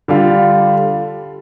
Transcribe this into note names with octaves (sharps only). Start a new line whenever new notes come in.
D3 G3 D4 F4